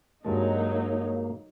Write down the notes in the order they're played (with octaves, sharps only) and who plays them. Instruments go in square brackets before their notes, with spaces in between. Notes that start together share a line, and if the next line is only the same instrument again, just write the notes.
[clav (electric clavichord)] G2 G#3 A5 [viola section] F#3 D#4 [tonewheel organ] A#3